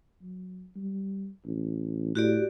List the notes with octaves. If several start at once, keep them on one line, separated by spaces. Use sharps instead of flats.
F#3
G3
A1
A2 F#4 G4 D5